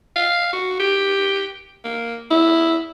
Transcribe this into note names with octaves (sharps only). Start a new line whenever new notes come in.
F5
F#4
G4
A#3
E4